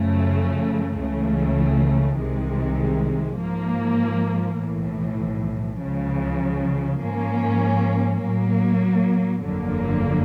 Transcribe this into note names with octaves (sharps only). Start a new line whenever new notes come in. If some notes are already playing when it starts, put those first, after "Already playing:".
Already playing: F#2 C#3 F3 A3
C#2 C#3 E3 A3
C2 C3 D#3 G#3
G#2 F3 A#3
B1 A2 E3
C#2 C#3 F3
G#2 F3 A#3 C#4
A2 F#3 A#3
G1 F2 D3 F#3 A#3